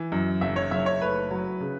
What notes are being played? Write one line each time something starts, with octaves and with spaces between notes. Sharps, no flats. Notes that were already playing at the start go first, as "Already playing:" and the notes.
Already playing: E3
F#2
F#1 E5
C#5
F#1 E5
C#5
A3 B4
F#3
C#3